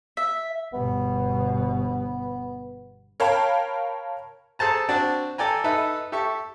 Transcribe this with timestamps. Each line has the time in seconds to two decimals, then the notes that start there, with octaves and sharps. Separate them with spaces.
0.17 E5
0.73 G1 B2 B3
3.20 A#4 C#5 F5 G5 A5 B5
4.59 G#4 A4 C5 A5 A#5
4.89 C4 D4 F#4 D5
5.38 A4 D5 G5 G#5 A#5
5.64 D#4 A4 B4 E5
6.12 G4 A4 E5 C#6